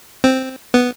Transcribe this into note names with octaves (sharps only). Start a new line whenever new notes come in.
C4
B3